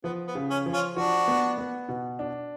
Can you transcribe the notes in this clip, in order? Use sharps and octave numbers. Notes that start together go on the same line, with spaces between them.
F3 B3
B3
C#3
C#4
F3
C#4 F4
F3 D4 F#4
B3
B3
B2
D4